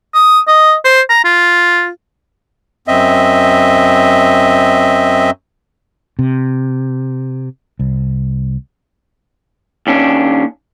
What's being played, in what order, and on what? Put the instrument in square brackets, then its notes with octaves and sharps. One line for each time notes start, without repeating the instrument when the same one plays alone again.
[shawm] D#6
D#5
C5
A#5
F4
[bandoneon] F#2 C4 D#5 E5
[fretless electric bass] C3
C2
[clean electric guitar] D#2 C#4 D4